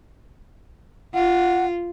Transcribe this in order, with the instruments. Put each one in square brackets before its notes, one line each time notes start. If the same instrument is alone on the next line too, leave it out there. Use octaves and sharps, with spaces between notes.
[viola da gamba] F4 [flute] F#5